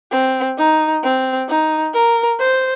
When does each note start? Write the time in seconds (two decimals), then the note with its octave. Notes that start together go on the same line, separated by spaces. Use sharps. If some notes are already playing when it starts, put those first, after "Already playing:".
0.12 C4
0.58 D#4
1.04 C4
1.49 D#4
1.93 A#4
2.39 C5